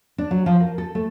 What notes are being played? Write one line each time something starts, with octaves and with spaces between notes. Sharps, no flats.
D4
F#3
F3
A#4
A4
A3